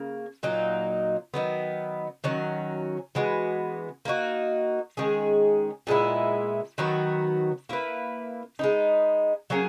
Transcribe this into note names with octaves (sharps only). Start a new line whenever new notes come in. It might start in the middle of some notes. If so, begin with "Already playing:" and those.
Already playing: C#3 A#3
A#2 F#3 A#3 D#4
D#3 F#3 B3
D#3 F#3 C#4
E3 G#3 B3 F#4
A#3 D#4 F#4
D#3 G#3 C#4 G#4
A#2 G#3 B3 E4
D#3 F#3 B3 F#4
A#3 E4 B4
G#3 B3 D#4
F#3 A#3 C#4 G#4